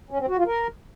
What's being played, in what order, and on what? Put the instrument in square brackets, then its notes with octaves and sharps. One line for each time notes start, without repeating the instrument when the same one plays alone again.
[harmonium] C#4
C4
F#4
F4
A#4